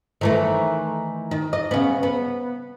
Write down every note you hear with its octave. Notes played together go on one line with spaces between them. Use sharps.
D#3 E3 A3
D#3
D#5
C#3 B3
B3